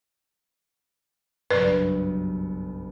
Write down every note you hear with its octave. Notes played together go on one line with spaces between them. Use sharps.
F#1 B1 G2 B4 D5